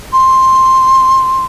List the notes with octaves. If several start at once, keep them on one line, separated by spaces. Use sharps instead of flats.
C6